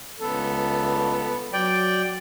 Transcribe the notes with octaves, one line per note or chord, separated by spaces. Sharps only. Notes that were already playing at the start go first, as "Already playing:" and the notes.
C#2 B3 A4
F#3 D5 G5